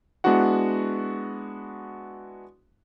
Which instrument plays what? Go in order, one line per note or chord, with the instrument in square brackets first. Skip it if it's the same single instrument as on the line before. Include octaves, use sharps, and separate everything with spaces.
[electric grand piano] G#3 B3 D4 E4 F#4 F#5